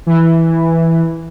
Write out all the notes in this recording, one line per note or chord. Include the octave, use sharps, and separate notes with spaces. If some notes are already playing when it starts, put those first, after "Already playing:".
E3